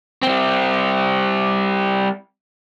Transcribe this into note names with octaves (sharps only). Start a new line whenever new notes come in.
G3 C4